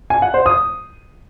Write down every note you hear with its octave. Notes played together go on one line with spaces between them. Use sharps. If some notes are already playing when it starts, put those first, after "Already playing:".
G#5
F#5
C5
D#6